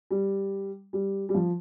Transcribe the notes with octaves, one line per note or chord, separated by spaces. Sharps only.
G3
G3
G3
F3